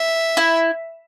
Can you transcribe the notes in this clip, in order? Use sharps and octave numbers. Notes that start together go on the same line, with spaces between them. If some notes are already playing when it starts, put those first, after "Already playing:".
Already playing: E5
E4